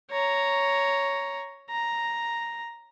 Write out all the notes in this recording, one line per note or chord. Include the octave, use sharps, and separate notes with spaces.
C#5 A#5
A#5